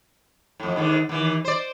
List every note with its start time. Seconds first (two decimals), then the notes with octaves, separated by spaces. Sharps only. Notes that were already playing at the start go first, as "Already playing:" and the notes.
0.60 F2 A2
0.76 D#2 G#2 D3
1.09 D#2 E3
1.45 C5 D5